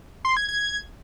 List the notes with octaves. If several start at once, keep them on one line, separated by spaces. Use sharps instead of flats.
C6
G#6
G#6